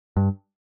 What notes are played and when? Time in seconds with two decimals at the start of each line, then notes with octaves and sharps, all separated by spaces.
0.17 G2